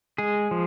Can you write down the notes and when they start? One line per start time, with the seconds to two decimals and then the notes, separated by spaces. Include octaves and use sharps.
0.18 G#3 G#4
0.51 F3